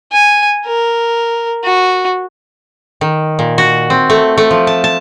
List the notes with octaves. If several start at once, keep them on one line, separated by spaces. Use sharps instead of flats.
G#5
A#4
F#4
D#3
A#2
F#4
C4
A3
A3
F3
A5
A5